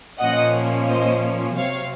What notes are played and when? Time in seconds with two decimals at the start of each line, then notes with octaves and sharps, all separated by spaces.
0.19 A#2 F3 A#3 C#4 D#5 F#5
0.88 C5 D#5
1.57 C3 F#3 C4 C#5 F5